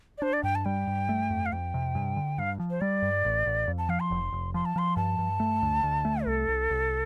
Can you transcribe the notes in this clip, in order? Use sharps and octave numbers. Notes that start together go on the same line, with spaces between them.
D5
D4 C5
D5
G2 G5
A5
G3 G5
G2
A3
F2
F5
F2 G5
C3
G2
D3
G2 F5
F3
C5
G3 D5
G2
A1
A1
F2
A5
F3 F5
C6
F1
F1
F3 C6
A5
F3 C6
G2 A5
G2
A3
D2
D2
A3
C2 A4
C2
C2